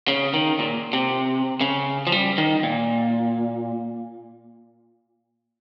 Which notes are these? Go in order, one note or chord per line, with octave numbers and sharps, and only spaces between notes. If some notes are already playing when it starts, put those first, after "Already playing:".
C#3
D#3
A#2
C3
C#3
F3
G3
D#3
A#2